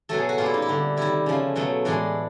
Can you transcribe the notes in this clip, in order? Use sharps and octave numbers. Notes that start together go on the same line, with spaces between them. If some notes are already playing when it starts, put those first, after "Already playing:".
B2 F#3 A3 A4
G#4
F#4
A#2 G3 F4
E4
D#4
E4
D3 G3
C3 D#3 G3 E4
C#3 F3 A3
B2 F#3 A3
A2 E3 G#3 D4